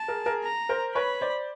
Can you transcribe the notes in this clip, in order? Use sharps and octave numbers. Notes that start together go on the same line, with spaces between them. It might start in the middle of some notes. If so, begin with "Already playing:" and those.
Already playing: A5
G#4 A#4
G#4 A#4
A#5
A#4 C5
B4 C#5 B5
C5 D5